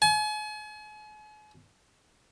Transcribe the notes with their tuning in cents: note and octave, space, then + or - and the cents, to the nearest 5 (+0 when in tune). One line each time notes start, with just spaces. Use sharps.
G#5 +40